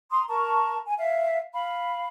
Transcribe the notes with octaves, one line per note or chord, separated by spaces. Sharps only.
A#5 C6 D#6
A#4 A5 A#5 C#6
G#5
E5 F5
F5 B5